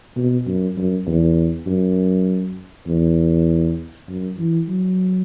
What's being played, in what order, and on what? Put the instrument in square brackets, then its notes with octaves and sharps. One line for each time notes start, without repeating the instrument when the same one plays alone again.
[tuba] B2
F#2
F#2
E2
F#2
E2
F#2
E3
F#3